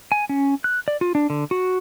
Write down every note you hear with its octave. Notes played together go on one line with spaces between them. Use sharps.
G#5
C#4
F#6
D5
F4
D4
D3
F#4